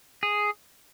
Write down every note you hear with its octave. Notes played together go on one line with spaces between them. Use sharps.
G#4